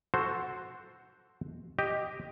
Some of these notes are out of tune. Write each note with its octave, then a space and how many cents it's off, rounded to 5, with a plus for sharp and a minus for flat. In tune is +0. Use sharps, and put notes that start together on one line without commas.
F#4 +0 A4 +0 C5 +0
G4 +0 D#5 +0